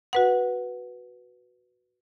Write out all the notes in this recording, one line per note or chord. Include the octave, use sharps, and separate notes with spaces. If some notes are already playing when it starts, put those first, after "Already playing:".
F#4 B4 F#5